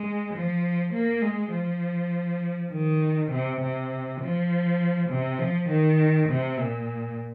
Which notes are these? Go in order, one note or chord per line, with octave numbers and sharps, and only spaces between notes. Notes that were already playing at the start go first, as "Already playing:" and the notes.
Already playing: G#3
F3
A#3
G#3
F3
D#3
C3
C3
F3
C3
F3
D#3
C3
A#2